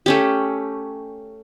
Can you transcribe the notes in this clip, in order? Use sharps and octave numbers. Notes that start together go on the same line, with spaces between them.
A3 C#4 G4